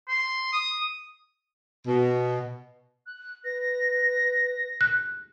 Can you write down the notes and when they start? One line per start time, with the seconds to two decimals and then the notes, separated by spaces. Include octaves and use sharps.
0.08 C6
0.53 D#6
1.86 B2
3.06 F#6
3.45 B4 A#6
4.81 F#6